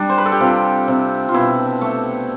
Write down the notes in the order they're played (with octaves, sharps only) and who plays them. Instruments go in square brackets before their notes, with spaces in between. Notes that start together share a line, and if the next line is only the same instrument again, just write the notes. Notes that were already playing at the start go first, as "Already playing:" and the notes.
Already playing: [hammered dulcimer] G3 D4
C5
B4
A4
G4
C3 F4
C3
F4
B2 E4
A3